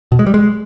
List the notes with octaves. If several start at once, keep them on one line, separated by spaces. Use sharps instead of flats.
B2
G#3
G3
G#3